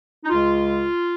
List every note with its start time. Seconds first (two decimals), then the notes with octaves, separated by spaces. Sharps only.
0.24 D#4
0.30 C#2 C#3 G#3 F4